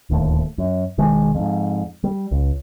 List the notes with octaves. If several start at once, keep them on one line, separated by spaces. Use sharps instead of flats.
D1 D#2 A3
F#2
E1 D#3 G#3
F2 G#2
G3
C#2